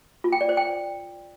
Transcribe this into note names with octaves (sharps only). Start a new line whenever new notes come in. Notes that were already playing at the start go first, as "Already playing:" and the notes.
F4
G5
D5
C5
G5